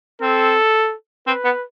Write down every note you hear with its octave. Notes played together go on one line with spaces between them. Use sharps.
C4 A4
C4 B4
B3